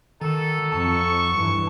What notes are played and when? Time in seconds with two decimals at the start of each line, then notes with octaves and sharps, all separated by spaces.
0.21 D#3 D#4 F#4 A4
0.72 F2 A5 C#6
1.36 G2 E3